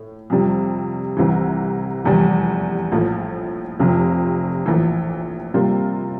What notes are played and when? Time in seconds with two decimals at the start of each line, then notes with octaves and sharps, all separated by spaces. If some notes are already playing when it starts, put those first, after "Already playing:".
Already playing: A2
0.30 F2 C3 G3
1.17 C2 C3 E3
2.05 F1 E2 E3 G3
2.92 A#1 A2 F3
3.80 F1 F2 C3
4.66 A#1 A2 E3
5.54 C3 G3 A#3 F4